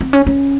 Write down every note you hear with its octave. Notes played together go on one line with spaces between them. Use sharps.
C4
C#4
C#4